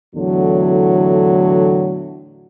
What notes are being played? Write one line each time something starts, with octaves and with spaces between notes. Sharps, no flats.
E2 A2 D3 F#3